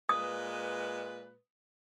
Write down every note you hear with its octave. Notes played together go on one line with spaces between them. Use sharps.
A#2 G#3 B4 D#6